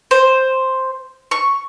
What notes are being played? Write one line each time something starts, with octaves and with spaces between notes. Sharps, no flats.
C5
C#6